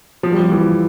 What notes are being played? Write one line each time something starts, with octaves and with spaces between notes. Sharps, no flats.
F3
G3
F3
E3